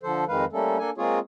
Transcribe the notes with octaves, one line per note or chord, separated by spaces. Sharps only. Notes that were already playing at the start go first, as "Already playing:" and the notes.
D3 F3 A4 C5
F2 D#3 G#3 B4 F5
G3 A3 A#3 C#4 A4
A#3 D4 A4 G#5
G#3 A#3 C4 F4 G#4 C#5